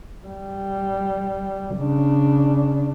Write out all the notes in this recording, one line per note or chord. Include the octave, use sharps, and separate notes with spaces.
G3
C#3 D4